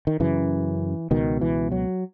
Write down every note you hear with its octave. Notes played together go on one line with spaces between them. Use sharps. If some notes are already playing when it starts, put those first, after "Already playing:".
D#3
F#2 C#3 E3
C#2 B2 D#3
E3
F#3